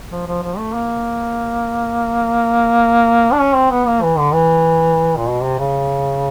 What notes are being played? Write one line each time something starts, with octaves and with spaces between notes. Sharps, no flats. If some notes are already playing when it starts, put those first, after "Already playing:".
F3
F3
F3
A3
A#3
D4
C#4
C4
B3
A#3
E3
D3
E3
A#2
B2
C3
C#3